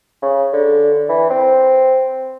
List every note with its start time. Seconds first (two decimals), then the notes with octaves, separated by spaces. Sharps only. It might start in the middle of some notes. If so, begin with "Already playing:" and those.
0.22 C#3
0.53 D3
1.09 E3
1.30 C4